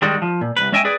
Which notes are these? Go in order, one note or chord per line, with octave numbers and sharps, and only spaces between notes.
D#3 G3 G#3 F#4
F3
A#2
C2 G2 B4
G#3 C#4 D#5 E5 G5 G#5
G#4 B4 D5